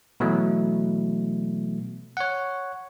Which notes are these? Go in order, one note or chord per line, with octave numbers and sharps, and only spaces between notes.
B2 E3 F#3 A3
C#5 F#5